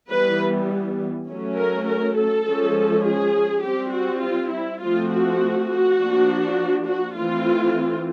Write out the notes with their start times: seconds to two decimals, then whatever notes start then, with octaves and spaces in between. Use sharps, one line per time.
0.10 E3 G3 B3 B4
1.28 F#3 A3 C#4
1.57 A#4
1.86 A#4
2.16 A4
2.45 F3 G#3 C#4
3.04 G#4
3.63 G3 C4 G4
3.92 F#4
4.22 F4
4.51 E4
4.81 F3 A3 C4 F4
5.10 F#4
5.69 F#4
5.98 F3 A#3 D4
6.86 F#4
7.16 E3 A3 C4 F4